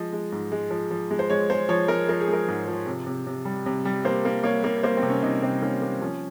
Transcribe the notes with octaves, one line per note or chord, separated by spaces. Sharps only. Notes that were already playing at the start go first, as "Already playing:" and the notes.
Already playing: F3 G#3 D#5
G#3
G#2
G#3
F3
F3
G#3
C5
G#3 C#5
G#3 C5
F3 C#5
G#3 A#4
F3 A#4
G#4
G#3 A#4
G#2
F3
C3
C3
C3
G3
C3
G3
A#3 C5
A#3
A#3 C#5
A#3
A#3 C5
C4
C3
C#4
C3 D#4
C3 C4
A#3 C#4
A#3
F3 C#4